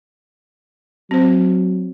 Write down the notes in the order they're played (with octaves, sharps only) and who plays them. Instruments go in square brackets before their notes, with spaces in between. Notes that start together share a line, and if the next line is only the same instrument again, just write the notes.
[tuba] F#3 [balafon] C4 C5